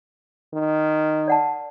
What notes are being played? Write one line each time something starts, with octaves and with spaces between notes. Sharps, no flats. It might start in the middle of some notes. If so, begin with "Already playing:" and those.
D#3
D5 F#5 A5